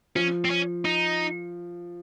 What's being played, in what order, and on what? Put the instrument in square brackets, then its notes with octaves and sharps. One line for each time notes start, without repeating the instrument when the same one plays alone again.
[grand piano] F3 [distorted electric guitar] C#4
[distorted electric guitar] C4
C#4
D#4